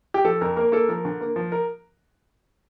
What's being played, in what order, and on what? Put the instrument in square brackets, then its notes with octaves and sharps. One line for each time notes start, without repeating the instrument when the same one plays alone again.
[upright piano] G4
F3 A4
F2 A#4
A#3 A#4
A#3 A4
F3 A#4
D3
A#3
F3
A#4